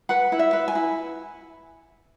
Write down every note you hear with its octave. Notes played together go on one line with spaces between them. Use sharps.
B4 F#5
E4
E5
B4
G#5
E4